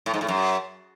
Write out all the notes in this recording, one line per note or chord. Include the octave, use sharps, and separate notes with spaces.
A2
G#2
A2
F#2